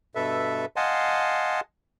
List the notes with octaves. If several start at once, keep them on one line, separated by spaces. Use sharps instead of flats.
G2 B2 A4 B4 E5
D#5 F5 F#5 G#5 A5 C6